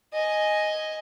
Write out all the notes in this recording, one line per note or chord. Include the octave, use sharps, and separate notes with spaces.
D#5 G#5